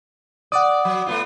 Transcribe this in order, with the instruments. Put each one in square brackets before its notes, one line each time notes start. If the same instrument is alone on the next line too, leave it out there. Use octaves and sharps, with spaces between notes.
[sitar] D5 [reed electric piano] F#5 D6 D#6
[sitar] F#3
A3 B3 F4